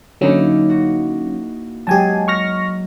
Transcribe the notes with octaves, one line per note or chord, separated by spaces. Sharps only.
D3 F#3 A#3 C#4 D#4 E4
F#4
F#3 G#3 G4 G#5 A5
C#6 F6 A#6